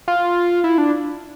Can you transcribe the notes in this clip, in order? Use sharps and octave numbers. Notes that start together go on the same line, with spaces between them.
F4
E4
D4